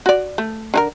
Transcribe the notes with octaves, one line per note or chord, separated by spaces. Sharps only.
F#4 D5
A3
D3 D#4 A#4